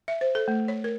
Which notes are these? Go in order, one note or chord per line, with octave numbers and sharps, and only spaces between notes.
E5
C5
A4
A3
C#5
A#4